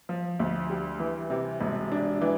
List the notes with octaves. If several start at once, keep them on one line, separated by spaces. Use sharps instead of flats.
F3
D2
G3
E3
C3
E1
D4
E3